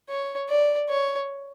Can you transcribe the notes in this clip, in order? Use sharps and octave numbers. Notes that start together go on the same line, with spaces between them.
C#5
D5
C#5